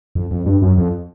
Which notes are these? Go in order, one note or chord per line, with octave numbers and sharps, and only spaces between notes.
F2
F2
G2
F#2
F2